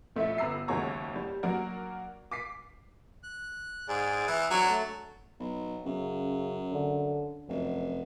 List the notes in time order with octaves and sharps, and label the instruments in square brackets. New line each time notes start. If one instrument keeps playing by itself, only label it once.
[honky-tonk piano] A#1 A3 E4 E5
G1 B4 A#5 E6 C7
F#1 D#2 G#3 F#4 C#5 A#5
G3
F#3 A#3 D4 F#4 A#4
D6 B6 C7
[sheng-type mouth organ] F#6
[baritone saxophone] G#2 [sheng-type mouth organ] G#4 D5
[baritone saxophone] E3
[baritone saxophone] F#3 [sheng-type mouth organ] D4 C#5 D5
[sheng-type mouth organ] A3 A5
[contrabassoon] B1
[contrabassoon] F#2 [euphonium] C#3
[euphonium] D3
[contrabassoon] F1 [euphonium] F#2